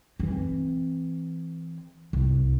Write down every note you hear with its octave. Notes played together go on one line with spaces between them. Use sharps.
E3 C4
C2